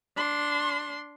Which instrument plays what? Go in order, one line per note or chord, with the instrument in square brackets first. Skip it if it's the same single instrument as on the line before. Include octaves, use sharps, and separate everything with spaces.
[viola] D4 C6